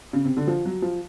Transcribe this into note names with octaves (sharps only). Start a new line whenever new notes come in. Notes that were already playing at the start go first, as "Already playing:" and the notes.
C#3
C3
D3
F3
F#3
F3